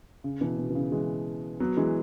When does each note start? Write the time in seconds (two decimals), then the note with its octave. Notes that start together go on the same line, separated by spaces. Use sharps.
0.24 C#3
0.41 B2 E3
0.58 B2
0.70 E3
0.75 C#3
0.92 E3 G#3
1.60 F#3 B3
1.77 E3 G#3